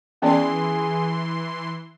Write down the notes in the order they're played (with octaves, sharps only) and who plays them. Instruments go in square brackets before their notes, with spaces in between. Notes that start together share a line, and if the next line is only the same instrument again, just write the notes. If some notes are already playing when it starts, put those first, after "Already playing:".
[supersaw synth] E3 C6 [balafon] B3 C#4 D5 [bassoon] G#4